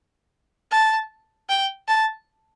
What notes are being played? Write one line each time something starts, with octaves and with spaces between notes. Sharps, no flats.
A5
G5
A5